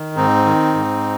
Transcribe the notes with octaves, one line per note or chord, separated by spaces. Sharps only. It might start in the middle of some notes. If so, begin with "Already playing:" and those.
Already playing: D#3
G#2 C4 D#4
D#3
G#2